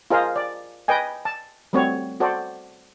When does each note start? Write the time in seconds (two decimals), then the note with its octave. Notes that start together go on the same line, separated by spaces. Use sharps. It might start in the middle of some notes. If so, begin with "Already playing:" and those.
0.11 F4 G#4 A#4 C5 D#5 F5
0.36 D5
0.88 B4 D#5 G5 G#5
1.25 A5
1.73 G3 A3 C4 F#4 C#5
2.20 F#4 A4 C5 D5